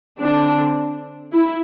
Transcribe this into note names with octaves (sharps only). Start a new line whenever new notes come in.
D3 C4 D4
E4